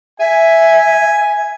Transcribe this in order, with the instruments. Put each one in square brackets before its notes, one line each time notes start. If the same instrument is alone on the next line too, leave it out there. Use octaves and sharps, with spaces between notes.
[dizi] E5 [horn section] G#5